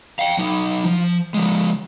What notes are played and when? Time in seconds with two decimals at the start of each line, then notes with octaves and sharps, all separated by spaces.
0.19 F5 G5
0.38 F#3 D#4
0.85 F3
1.34 F3 G#3